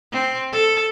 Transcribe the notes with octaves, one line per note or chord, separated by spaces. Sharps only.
C4
A4